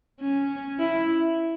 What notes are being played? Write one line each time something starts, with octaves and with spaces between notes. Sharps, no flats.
C#4
E4